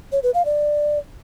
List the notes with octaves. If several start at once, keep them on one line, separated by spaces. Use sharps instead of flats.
C#5
B4
F5
D5